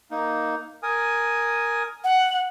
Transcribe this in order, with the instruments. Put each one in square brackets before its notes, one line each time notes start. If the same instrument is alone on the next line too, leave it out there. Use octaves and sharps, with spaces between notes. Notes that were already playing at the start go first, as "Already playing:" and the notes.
[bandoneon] A#3 D#4
A#4 G#5 D#6
[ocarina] F#5